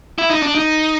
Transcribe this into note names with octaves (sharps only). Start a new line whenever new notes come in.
E4
D#4
D4
D#4